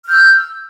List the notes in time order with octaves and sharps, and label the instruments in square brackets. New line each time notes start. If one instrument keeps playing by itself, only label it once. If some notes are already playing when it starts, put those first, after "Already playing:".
[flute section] F6
G6
E6